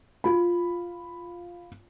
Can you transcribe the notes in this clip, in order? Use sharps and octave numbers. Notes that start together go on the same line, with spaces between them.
F4 B5